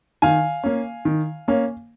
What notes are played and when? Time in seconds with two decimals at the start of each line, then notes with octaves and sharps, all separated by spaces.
0.22 D#3 F5 G#5
0.64 A#3 C#4
1.05 D#3
1.48 A#3 C#4